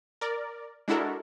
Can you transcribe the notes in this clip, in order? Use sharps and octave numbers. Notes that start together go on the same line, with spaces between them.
A#4 D5
G#3 D4 E4 F#4 A4 A#4